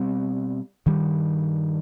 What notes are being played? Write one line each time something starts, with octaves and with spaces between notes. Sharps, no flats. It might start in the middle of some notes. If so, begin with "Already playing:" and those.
Already playing: B2 G3 C4
G2 D#3 G3